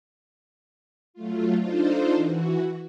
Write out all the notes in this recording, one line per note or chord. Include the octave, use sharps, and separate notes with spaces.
F#3 A3 F4
D4 D#4 F4 A4 C5
E3 F#4